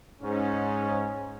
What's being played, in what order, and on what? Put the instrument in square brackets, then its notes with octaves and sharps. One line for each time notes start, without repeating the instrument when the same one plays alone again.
[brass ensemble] G#2 C#4